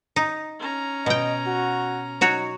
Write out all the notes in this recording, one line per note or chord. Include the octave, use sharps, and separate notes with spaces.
D#4
C#4 A#5
B2 D#5 G5
F#4
F#3 D#4 F#4 C#5